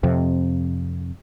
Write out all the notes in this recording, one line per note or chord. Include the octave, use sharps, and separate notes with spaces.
F2 C3